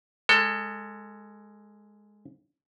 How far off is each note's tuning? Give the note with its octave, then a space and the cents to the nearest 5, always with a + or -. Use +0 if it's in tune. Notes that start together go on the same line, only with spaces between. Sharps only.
G#3 +0 A4 +20